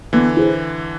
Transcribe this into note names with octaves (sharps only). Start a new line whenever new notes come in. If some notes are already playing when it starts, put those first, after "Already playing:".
D3 E3 B3
E4 G#4 C5